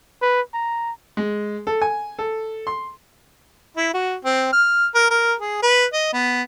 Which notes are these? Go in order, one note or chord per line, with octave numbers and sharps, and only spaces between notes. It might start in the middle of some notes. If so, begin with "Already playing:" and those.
B4
A#5
G#3
A4
G#5
A4
C6
E4
F#4
C4
F6
A#4
A#4
G#4
B4
D#5
B3